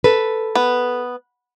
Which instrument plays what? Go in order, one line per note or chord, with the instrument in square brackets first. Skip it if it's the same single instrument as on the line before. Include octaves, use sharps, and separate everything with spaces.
[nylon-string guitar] A4 B4
[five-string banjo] B3